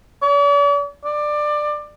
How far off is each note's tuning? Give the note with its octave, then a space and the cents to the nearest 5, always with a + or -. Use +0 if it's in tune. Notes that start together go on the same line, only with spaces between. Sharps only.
D5 -45
D5 +20